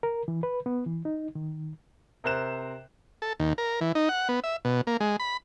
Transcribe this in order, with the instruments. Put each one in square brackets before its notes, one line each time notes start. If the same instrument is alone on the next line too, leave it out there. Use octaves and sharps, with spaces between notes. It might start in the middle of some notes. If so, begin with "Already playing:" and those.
[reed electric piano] A#4
E3
B4
B3
E3
D#4
D#3
[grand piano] C3 A#4 C5 F#6 E7
[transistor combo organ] A4
D#2
A#4
E3
D#4
F#5
B3
E5
B2
A#3
G#3
B5